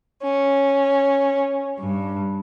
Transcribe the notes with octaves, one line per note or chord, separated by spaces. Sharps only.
C#4
G2